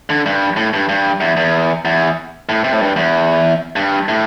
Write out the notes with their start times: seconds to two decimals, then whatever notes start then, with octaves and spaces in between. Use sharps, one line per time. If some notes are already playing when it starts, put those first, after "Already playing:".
0.10 D3
0.26 G2
0.57 A2
0.74 G2
0.89 G2
1.21 E2
1.37 E2
1.85 E2
2.49 A2
2.64 C3
2.72 A2
2.81 G2
2.96 E2
3.76 G2
4.09 A2